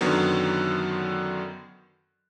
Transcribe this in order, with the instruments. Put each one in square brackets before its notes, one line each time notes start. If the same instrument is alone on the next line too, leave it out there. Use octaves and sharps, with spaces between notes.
[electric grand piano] F#2 D3 D#3 F#3 B3